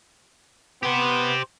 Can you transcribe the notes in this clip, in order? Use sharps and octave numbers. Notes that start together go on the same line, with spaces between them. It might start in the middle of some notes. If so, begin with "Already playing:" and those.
B3 G4 C5